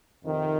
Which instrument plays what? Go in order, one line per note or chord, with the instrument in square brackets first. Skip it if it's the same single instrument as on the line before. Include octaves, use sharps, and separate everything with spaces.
[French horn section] F2 C3 D#3